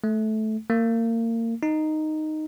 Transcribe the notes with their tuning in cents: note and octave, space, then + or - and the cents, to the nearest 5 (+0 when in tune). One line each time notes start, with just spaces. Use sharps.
A3 -15
A#3 -30
D#4 -5